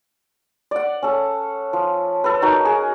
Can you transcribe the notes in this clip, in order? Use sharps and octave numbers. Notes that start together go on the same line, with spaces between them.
D5 F#5
C#4 A4
F3
A4 B4
D#4 F#4 A#4
G#4